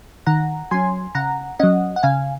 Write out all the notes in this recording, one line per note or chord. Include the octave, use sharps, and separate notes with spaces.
D#3 F#5 A#5
F#3 C#4 G#5 C6
C#3 F#5 A#5
F#3 C#4 D#5 F#5
F#5
C#3 F5 G#5